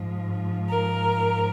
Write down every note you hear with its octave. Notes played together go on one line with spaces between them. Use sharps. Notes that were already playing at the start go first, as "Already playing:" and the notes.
Already playing: G#2 F3
A#4